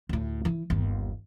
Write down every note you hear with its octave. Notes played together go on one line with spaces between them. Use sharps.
D2 A2
E3 E4
G1 D#2